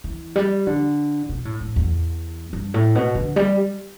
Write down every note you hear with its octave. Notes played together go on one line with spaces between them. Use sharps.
E3
G3
D3
B2
A2
A2
E2
G2
A2
B2
D3
G3